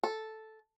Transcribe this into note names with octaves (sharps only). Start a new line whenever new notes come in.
A4